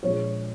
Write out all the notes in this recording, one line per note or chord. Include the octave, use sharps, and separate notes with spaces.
A#1 A#2 G#3 C#5